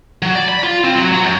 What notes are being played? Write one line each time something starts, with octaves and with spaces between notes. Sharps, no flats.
F#3
D5
B5
F4
C4
F#3
F#3
F#2